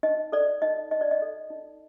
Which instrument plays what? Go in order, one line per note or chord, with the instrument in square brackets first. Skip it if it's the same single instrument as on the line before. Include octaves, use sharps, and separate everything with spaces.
[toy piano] D#4 D#5
A4 D5
D#4 D#5
D#4 D#5
D5
D#5
A4
D#4